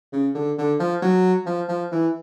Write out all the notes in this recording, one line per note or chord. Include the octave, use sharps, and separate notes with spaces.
C#3
D3
D3
F3
F#3
F3
F3
E3